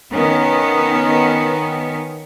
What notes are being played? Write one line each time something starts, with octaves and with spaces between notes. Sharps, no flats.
D#3 B3 C#4